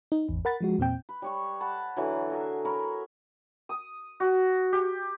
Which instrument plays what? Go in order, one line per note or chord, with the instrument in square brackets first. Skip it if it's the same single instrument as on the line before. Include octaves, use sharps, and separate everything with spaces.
[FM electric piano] D#4
G#1 E2
A#4 F#5 B5 A6
F3 G#3 F#4
E2 A#2 C4 G5
[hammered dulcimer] B4
G3 C#5 C#6
F#5 A5 B5 C#6
D3 E3 F#3
F#4 G#4 A#4 E5
A#4 C#5 A#5 B5
[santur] D#6
F#4
G4